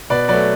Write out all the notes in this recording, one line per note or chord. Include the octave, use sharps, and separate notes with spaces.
B2 B4 D5
F#3 A3 B4 D5